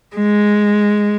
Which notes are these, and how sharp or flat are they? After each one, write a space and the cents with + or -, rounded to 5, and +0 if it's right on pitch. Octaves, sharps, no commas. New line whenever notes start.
G#3 +0